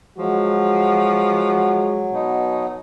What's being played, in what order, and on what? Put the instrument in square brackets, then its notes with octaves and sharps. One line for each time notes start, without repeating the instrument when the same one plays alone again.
[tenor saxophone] F3 [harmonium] F#3 [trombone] G#3 [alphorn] F#4
[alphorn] B2 [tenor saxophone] D#4